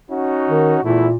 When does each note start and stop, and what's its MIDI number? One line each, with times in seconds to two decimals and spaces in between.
0.10 0.81 61
0.10 0.81 63
0.10 0.81 66
0.49 0.74 51
0.84 1.08 40
0.84 1.16 46
0.84 1.08 57
0.84 1.08 64